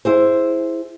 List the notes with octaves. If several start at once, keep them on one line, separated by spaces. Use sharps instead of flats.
E4 G#4 C5